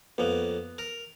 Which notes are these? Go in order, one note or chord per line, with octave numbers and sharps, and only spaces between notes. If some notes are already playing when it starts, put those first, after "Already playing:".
F2 A#3 B3
A#4